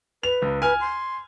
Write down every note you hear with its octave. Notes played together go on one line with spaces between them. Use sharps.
B4 F7
C#2
B4 G#5 F6
C6